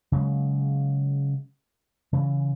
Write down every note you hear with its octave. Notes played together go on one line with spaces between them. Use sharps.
C#3 F#3 G#3
C#3 E3